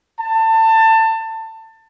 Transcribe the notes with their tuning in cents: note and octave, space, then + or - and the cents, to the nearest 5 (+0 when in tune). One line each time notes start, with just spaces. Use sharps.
A5 +25